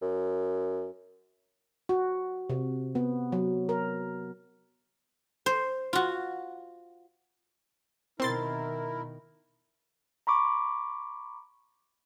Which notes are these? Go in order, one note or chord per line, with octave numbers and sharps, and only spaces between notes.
F#2
F#4
C3
B3
F#3
A#4
C5
F4 F#4
B2 D#3 C4 E4 A#4 C6 A6
A#5 B5 C#6 D6